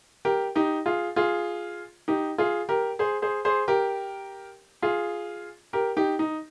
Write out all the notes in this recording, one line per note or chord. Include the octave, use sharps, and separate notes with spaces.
G4 A#4
D#4 G4
F4 G#4
F4 G#4
D#4 G4
F4 G#4
G4 A#4
G#4 C5
G#4 C5
G#4 C5
G4 A#4
F4 G#4
G4 A#4
D#4 G4
D#4